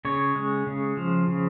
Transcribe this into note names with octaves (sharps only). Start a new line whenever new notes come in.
C#3 C#5
G#3
C#3
F3
C#3